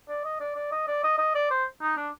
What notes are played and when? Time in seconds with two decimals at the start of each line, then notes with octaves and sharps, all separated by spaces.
0.09 D5
0.25 D#5
0.40 D5
0.56 D5
0.72 D#5
0.88 D5
1.04 D#5
1.18 D#5
1.35 D5
1.50 C5
1.81 D#4
1.97 D4